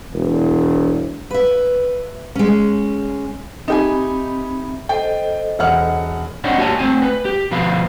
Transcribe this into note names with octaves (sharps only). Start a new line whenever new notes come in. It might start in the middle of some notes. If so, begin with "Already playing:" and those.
E1
B4 E5
G#3 C#4
C4 D#4 G4 E5 G#5 B5
A4 C5 D#5 G5
E1 F#5 F6
C4 D4 E4 C#5 D#5 F#5
A#3 F#4 G4 C#5 G#5 A5
A3 C4 G#5
B4
G4
D2 B2 F3 B4 F5 B5